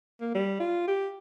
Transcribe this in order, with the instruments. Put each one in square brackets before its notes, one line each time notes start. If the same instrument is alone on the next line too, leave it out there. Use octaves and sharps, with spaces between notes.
[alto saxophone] A#3
G3
F4
G4